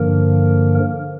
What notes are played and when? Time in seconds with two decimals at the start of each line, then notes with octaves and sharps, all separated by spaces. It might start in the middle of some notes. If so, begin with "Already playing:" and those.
Already playing: G2 D3 F3 A#3 A#4